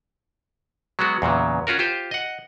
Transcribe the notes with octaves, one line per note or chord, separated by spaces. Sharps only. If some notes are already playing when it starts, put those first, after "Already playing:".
F#3 G#3 B3 F#4
E2 A#2 C#3 F#3
C#4 F4 F#4 A#4
F4 G4 C5
D#5 F#5